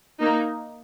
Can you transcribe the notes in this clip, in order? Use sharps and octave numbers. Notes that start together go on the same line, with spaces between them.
A#3 D#4